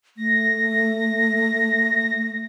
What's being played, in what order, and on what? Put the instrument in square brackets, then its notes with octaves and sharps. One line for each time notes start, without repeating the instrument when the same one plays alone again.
[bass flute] A3 [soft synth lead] A#6